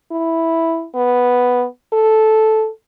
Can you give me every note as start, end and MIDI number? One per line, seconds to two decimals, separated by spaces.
0.12 0.86 64
0.95 1.65 59
1.93 2.68 69